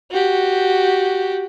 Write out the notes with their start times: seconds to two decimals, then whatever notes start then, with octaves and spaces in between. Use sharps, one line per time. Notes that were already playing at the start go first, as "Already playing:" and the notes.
0.11 F#4 G4